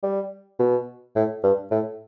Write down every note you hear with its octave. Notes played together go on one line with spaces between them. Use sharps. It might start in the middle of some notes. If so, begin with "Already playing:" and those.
G3
B2
A2
G2
A2